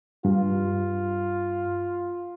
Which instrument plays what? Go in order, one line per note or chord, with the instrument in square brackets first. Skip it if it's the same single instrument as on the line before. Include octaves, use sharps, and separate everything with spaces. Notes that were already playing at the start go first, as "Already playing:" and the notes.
[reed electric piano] G2 [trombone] F4